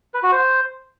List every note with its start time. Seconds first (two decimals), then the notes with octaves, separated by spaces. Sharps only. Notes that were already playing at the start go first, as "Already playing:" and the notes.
0.14 B4
0.23 F#4
0.32 C5